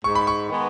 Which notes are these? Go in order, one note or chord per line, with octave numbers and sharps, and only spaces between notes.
G#2 C#6
B5
C#6
D#3 G#3 B3 D#4